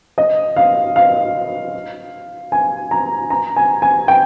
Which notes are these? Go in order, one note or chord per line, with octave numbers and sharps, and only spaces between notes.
D#5
F5
F5
G#5
A#5
A#5
G#5
G#5
G5